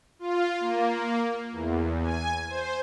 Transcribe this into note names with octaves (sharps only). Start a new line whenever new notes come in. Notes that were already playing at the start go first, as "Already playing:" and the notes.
F4
A#3
E2
G#5
C5